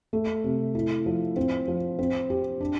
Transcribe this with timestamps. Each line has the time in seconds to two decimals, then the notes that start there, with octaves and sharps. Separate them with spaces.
0.13 A3
0.44 C3
0.75 E4
1.06 F3
1.36 C4
1.68 F3
1.99 C4
2.30 G4
2.61 D4